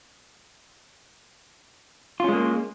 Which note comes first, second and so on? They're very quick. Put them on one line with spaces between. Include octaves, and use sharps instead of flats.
F4 C#4 G#3 A#3